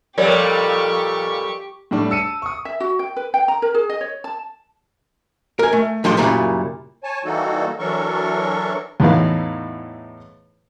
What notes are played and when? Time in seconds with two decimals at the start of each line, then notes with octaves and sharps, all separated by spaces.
0.18 F2 A#2 G3 G4 A#4 C#5 D5 C#6
1.91 A2 G3 D4
2.10 A5 E6 C#7 D#7
2.42 C#6 D#6
2.65 E5
2.80 F#4
2.99 G5
3.16 B4
3.34 G5
3.48 A#5
3.62 A#4
3.75 G#4
3.90 D#5
4.01 C#5
4.24 A5
5.59 A#4 G#5
5.73 A3
6.04 A2 F3 G3 G5 C6
6.17 F#2 A#2 C#3 G3 E4
7.04 C#5 G#5 A5
7.25 E3 G3 A#3 D#4 F#4 A4
7.79 E3 F#3 D4 A4 A#4 C#6
9.00 E2 A2 D#4 E4 B4 F5